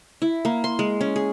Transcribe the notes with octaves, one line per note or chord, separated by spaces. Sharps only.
E4
A#3
C6
G#3
C#4
G#4